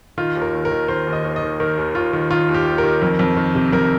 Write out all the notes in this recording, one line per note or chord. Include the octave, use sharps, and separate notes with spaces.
D#3 F4
D#2
A#4
D#2
A#4
D#3
D#3 C5
D#2
D#5
D#2
D#5
D#3
D#3 A#4
D#2
D#2 F4
D#3
D#3 F4
D#2
G4
D#2
A#4
D#3
F2
F2
D#3
C3
F2 A#4